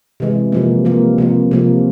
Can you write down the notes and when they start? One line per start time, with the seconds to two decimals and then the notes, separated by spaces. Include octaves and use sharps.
0.20 C3 E3 G#3
0.52 C3 F3 A#3
0.85 C3 F3 A#3
1.18 C3 F3 A#3
1.51 C3 F3 A#3